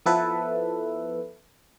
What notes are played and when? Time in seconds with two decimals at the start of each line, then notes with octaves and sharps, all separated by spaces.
0.06 F3 B3 E4 A4 B4 E5